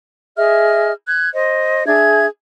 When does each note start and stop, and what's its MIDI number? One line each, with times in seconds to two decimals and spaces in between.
0.36 0.92 68
0.36 0.92 75
0.36 0.92 76
0.36 0.92 89
1.07 1.28 90
1.07 1.28 92
1.33 1.85 72
1.33 1.85 75
1.86 2.26 62
1.86 2.26 68
1.86 2.26 76
1.86 2.26 92